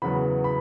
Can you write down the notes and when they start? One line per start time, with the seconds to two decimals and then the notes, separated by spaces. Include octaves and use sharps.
0.02 E2 C#3 F#3 B3 B5
0.44 B5